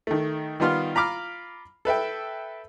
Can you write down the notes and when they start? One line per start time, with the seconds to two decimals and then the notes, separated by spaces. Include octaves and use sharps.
0.07 D#3 A3
0.60 D#3 G3 B3 F4 C6 F6
0.95 F4 A#5 B5 D6 F6
1.85 A4 B4 E5 G5